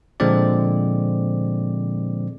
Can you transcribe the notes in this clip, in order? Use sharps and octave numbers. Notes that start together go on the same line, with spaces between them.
A#2 D3 F3 G#3 C4 D5